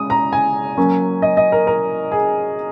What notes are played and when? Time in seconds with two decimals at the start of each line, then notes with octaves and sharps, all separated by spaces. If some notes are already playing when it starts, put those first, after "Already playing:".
Already playing: C#3 G#3 D#6
0.10 A#5
0.33 G#5
0.77 F#3 A#3 C#4
1.22 D#5
1.37 D#5
1.52 A#4
1.67 A#4
2.12 G#4